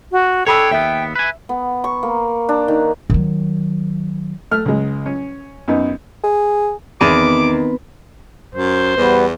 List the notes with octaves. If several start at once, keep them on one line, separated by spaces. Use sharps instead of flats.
F#4
D4 G#4 A4 C#5 G5 B5 E6
D#2 B3 E5
B4 G#5
B3
C#6
A#3
D4
D#3
D#3 F#3
A3 F6
C#2 G#3
C#4
F#2 B3 D#4
G#4
E2 D#3 B3 C4 B4 D6
F#2 C5
E2 G3 B3 B4